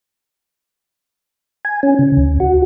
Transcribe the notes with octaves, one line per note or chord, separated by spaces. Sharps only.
G#5
C#4
C#3
D2
F#4